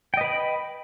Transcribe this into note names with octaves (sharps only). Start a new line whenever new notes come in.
B4 D#5 G5 B5